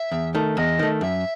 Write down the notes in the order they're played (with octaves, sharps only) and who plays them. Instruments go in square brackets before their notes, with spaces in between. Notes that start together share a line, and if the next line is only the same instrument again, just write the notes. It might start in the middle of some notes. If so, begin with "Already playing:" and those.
Already playing: [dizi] E5
[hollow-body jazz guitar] E2
D#3 A3
[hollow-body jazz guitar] E2 [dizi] D#5
[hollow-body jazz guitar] D#3 A3
[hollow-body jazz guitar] F#2 [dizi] E5